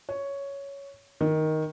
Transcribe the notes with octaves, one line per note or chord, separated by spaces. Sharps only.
C#5
D#3